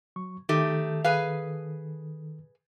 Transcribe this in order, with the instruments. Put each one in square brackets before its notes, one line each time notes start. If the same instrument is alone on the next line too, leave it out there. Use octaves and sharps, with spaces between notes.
[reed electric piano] F#3 C#6
[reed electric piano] D#3 A4 [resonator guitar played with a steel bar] A3 D#4 G4
[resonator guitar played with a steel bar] G#4 B4 F5